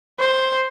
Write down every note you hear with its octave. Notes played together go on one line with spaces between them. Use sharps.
C5